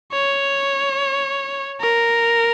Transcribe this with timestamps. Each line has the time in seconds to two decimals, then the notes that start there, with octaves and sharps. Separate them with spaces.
0.12 C#5
1.81 A#4